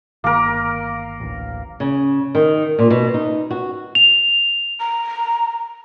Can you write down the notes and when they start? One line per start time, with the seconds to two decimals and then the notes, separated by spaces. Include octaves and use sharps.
0.24 G1 D#3 A#3 A#4
1.20 D1 A1
1.80 C#3
2.35 D#3
2.79 A#2
2.90 B2
3.14 D#4
3.51 F#4
3.95 F7
4.80 A#5